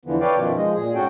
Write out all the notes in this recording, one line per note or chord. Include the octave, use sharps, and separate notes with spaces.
E2 D3 E3 F3 B3
A4 B4 C#5 D5 F5 G5
F#2 B2 D#3 F3
F3 G#3 D#5
A#2 G#4
G#2 C#4 F#4 A4 G5